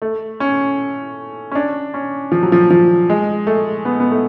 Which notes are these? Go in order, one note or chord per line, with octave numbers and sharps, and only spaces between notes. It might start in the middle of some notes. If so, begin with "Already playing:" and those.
A3
C#4
C#4
D4
C#4
F3
F#3
F3
F3
G#3
A3
B3
B3
A3